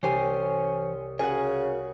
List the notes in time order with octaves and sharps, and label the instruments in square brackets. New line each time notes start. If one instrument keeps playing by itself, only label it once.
[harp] C2 G4 C7 [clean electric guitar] E3 C5 G#5 [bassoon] C#4
[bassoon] C#3 [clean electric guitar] F#4 A#4 C#5 [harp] F#5 G#5